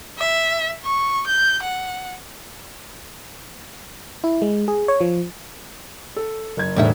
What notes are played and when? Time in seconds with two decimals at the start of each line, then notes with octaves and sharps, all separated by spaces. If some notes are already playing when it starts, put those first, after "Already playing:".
0.18 E5
0.85 C#6
1.27 G6
1.63 F#5
4.24 E4
4.42 G#3
4.68 G#4
4.88 C#5
5.01 F3
6.16 A4
6.57 F#1 G#6
6.76 E1 A2 D3 G3 E5